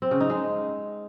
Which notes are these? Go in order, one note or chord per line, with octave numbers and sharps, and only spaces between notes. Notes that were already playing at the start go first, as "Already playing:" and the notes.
C4
C#3
D#4
G#3